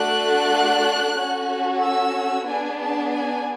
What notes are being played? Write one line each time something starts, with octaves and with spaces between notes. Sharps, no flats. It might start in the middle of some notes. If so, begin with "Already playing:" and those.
Already playing: A3 D4 F#4 A4 F#6
C#4 F#4 A4
E6
B3 D4 G#4 G#5
A5
G#5